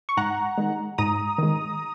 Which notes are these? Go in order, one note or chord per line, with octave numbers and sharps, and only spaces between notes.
C#6
G#2 F#5 A#5
D#3 G#3
G#2 A#5 D#6
D#3 G#3